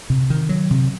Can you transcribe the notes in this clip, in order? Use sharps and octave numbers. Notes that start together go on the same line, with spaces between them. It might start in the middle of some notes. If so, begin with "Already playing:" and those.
C3
D#3
F#3
C3